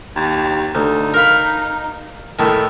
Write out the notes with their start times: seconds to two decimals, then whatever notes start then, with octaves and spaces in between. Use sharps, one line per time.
0.16 D#2
0.75 D2 D#4
1.14 A#4 F5 B5
2.39 A2 D#3 A3